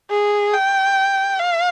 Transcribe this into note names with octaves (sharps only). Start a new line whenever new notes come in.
G#4
G5
F5